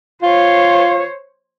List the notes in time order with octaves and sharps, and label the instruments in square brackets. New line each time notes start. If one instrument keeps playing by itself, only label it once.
[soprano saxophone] F4 [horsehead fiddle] C5 C#5